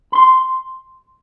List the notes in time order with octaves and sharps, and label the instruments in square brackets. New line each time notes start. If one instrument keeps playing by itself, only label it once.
[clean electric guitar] B5 C6